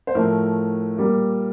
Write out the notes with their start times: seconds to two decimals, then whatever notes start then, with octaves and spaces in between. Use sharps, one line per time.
0.07 C5
0.15 A2 F3 A3 A#4
0.97 A#2 G3 A#3